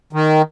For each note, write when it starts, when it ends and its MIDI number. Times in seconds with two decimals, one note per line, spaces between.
0.13 0.42 51